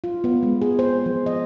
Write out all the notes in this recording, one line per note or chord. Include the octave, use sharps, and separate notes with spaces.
F4
B3
G#3
G#4
C5
F3
D#5